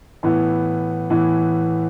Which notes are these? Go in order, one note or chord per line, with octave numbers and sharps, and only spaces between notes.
A2 E3 B3 E4
A2 E3 B3 E4